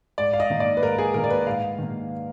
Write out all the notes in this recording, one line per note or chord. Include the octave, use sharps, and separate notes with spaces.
G#2 D5
F5
D#5
D#3 A#3
D5
B4
G#2 A#4
G#4
D#3 A#3 A#4
D5
B4
G#2 F5
D#3 A#3